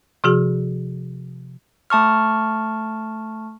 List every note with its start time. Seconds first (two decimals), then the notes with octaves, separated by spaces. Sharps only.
0.24 C3 F3 F#4 G#4
1.90 A3 A5 C#6 F6